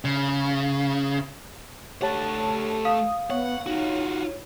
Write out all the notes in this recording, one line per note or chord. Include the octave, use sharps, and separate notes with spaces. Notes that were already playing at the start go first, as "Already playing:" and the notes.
C#3
A3 G4 C#5 F#5 A5
F5 D#6
B3 C#5 F#5
D#4 F4 F#4